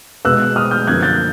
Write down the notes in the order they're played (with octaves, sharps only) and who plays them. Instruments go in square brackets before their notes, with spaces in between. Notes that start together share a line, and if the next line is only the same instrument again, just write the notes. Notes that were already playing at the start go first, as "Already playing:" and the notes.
[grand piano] B2 G#3 B3 E6 F#6
D#6 F6
F6 G6
F#2 D3 F3 A#3 F#6 G#6
G6 A6